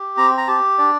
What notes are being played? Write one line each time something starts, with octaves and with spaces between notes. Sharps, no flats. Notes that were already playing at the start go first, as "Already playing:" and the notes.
Already playing: G4
C4 A#5
A#5
G4 A5
D4 D5